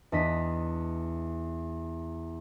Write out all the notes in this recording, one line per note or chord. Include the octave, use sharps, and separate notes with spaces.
E2 D4 D#5 B6